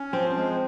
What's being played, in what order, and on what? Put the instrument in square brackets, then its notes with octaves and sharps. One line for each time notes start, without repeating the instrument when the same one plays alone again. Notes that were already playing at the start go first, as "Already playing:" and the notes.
Already playing: [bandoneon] C#4
[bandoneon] F3 [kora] C4
[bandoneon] G#3